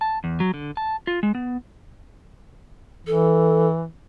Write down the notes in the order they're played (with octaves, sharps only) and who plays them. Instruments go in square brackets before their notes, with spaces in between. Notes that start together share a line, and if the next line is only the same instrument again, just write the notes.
[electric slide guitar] A5
E2
F#3
D3
A5
F4
G#3
B3
[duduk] E3 [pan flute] A4